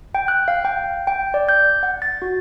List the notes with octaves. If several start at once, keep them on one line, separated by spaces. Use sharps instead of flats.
G5
F#6
F5
G5
G5
D5
G6
F#5
A6
F#4